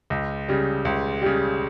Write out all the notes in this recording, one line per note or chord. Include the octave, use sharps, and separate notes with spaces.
C#2
C#3 G3
C#2
C#3 G3